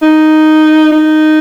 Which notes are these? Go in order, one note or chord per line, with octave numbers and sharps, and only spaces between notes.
D#4
D#4